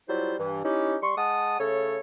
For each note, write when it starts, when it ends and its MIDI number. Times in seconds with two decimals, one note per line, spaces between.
0.09 0.34 54
0.09 0.34 55
0.09 0.34 64
0.09 0.34 65
0.09 0.34 72
0.39 0.64 43
0.39 0.64 52
0.65 0.97 61
0.65 0.97 63
0.65 0.97 64
0.65 0.97 67
1.03 1.13 55
1.03 1.13 84
1.03 1.13 85
1.17 1.58 56
1.17 1.58 78
1.17 1.58 81
1.17 1.58 87
1.59 1.98 49
1.59 1.98 57
1.59 1.98 69
1.59 1.98 73